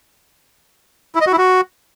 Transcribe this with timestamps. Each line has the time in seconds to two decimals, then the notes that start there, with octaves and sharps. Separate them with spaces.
1.15 E4
1.21 D#5
1.27 F#4
1.32 E4
1.38 F#4